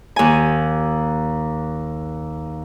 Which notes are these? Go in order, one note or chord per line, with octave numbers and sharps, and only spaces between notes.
D#2 G#5